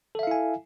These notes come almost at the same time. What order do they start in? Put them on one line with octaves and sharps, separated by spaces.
A4 E5 F5 E4 G#5